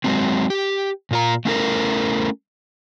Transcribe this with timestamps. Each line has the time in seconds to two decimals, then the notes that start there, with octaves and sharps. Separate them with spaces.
0.04 F#3 G#3 C4
0.50 G4
1.11 A#2 F4 A#5
1.45 A3 C#4 E4 A4 A#4